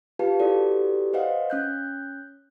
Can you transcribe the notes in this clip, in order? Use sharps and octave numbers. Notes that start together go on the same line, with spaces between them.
F4 G4 B4 F5 A5
E4 F#4 G4 A4 B4 D5
B4 C5 D#5 F5 F#5
C#4 F#6 G6